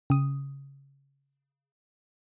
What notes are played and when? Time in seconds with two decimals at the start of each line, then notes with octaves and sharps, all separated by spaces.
0.10 C#3 D#6